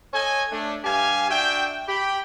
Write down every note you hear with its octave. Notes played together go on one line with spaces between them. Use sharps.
A4 C#5 D#5 G#5
A3 D4
G2 G4 F5 G#5
D4 F#4 E5 G5
G4 G5 B5